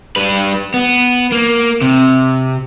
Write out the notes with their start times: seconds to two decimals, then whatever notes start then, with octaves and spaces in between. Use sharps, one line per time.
0.16 G3 B4
0.74 B3
1.32 A#3
1.82 C3